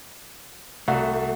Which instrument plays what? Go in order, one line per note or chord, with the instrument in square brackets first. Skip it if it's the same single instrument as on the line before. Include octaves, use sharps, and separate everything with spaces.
[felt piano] C2 F#4 [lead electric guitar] A3